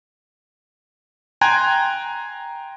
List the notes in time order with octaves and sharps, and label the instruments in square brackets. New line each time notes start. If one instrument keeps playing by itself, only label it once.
[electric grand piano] G5 G#5 A#5 C6 F#6 G#6